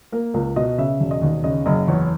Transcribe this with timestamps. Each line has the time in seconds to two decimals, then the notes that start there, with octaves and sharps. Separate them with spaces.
0.12 A#3 A#4
0.34 C#2 A#4
0.56 B2 D#5
0.78 C#3 E5
1.00 E1
1.11 D#5
1.21 D#2
1.44 C#3 D#5
1.66 F#1 D#5
1.88 E2 C#5